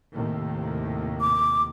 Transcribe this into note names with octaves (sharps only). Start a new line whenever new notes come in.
D#2 A2 C3
D6